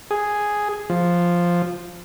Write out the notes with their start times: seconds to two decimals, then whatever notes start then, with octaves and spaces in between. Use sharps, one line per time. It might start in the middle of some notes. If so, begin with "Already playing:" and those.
0.11 G#4
0.90 F3